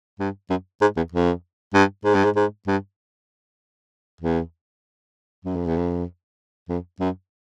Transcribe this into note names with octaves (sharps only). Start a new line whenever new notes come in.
G2
F#2
G#2
E2
F2
G2
G#2
G2
G#2
G#2
G2
E2
F#2
F2
E2
F2
F2
F#2